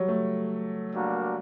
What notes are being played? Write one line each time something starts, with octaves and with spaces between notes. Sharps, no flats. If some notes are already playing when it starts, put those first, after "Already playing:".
Already playing: F#3 G3
A3
G3 A#3 D4 F#4 A#4